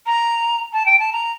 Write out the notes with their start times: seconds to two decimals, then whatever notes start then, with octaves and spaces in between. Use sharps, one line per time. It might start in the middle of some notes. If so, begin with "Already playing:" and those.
0.06 A#5
0.73 A5
0.86 G5
0.99 A5
1.13 A#5